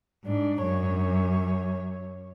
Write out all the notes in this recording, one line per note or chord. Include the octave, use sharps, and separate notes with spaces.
G#2 D4
F#2 C#5